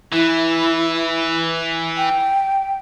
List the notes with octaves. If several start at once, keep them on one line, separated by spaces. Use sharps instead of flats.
E3 E4
G5